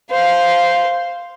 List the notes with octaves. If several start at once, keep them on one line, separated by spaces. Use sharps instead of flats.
C5 F5